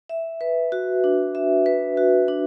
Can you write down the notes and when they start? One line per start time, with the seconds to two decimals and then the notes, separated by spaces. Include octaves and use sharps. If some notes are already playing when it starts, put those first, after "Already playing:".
0.09 E5
0.41 B4
0.72 F#4
1.04 D4
1.35 E5
1.66 B4
1.97 F#4
2.28 D4